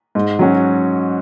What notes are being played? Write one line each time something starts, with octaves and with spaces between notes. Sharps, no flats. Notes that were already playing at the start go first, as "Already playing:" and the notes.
G#2
F#3 C#4 F#4